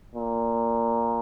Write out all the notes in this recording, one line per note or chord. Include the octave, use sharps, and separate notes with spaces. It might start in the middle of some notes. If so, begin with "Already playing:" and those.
A#2